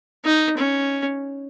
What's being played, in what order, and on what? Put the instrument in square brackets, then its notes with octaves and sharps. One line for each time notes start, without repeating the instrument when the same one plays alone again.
[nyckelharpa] D#4
C#4